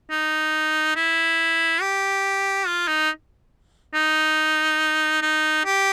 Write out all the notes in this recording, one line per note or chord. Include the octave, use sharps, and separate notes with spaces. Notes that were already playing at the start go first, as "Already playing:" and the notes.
D#4
E4
G4
F4
D#4
D#4
D#4
G4